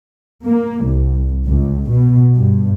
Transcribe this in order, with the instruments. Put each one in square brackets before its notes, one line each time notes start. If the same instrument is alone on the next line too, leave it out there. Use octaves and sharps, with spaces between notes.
[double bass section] A#3
C2
C#2
B2
G2